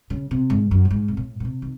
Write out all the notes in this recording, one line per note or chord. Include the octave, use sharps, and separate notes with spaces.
C#3
C3
G#2
F#2
A2
G#2
C3
A2
A2
C3
D#3